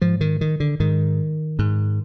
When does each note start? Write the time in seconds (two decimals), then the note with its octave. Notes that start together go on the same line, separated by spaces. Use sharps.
0.01 G#2 F3
0.21 D#3
0.41 D#3
0.60 D3
0.80 G#2 D#3
1.59 G#2